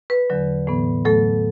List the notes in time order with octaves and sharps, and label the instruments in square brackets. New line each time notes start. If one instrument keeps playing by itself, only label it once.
[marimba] B4
E2 D3 F#3
A2 E3 B3
A2 F#3 A3 A4